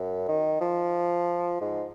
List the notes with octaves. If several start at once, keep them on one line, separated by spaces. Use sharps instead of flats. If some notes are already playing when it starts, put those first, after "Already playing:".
Already playing: F#2
D#3
F3
G#2